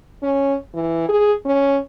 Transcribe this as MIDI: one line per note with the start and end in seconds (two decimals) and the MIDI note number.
0.23 0.55 61
0.74 1.08 52
1.09 1.32 68
1.45 1.78 61